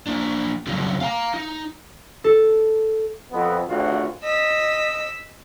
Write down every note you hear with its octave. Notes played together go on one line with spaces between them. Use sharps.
A#3 D4
C#3 F#3 G3 A#3 C4 D#4
F5 G5 A#5
D#4
A4
F2 B3
G#1 D2 F4 F#4
D#5 E6 B6